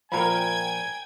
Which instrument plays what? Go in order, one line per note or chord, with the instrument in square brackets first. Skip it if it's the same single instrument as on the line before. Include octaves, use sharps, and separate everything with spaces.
[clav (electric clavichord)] A#2 F3 [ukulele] A#4 A#5 B5 [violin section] G5 G#6 [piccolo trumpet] G#5